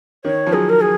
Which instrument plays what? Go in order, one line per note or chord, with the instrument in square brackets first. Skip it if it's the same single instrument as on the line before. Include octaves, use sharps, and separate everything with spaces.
[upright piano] D#3 [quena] C#5
[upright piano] F3
[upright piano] F#3 [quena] G#4
[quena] A#4
G#4